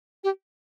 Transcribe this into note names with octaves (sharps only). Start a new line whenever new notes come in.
G4